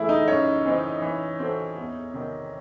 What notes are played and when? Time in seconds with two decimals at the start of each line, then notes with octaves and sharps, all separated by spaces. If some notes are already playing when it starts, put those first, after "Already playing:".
Already playing: C#3 E3 A3 E4 G#4 E5
0.09 D#4 D#5
0.27 F#2 C#4 C#5
0.65 E3 C4 D#4
1.02 E3
1.39 C4 F#4 A4
1.77 E2
2.14 C3 D#3